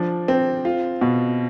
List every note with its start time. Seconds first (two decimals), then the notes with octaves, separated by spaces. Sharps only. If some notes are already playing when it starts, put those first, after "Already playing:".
Already playing: F3 D4
0.28 C4
0.65 F4
1.01 B2